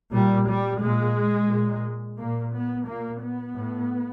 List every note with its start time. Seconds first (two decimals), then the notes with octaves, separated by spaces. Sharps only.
0.13 A#2 G3
0.48 G3
0.82 A#2 G#3
1.51 A#2
2.19 A#2 A#3
2.53 B3
2.88 A#2 A#3
3.22 B3
3.56 A2